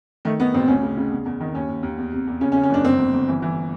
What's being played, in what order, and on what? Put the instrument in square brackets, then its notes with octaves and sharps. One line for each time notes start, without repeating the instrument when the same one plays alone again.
[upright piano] D#3 A3
D#3 B3
A1 C4
D2 C#4
C#3
C#3
E2
E2
D#3
D#2 C#4
D#2
D#2
E2
C3
E2
C#3 C#4
C#4
C#3
C#4
F#1 D4
G1 C4
G1
G1
E3
E3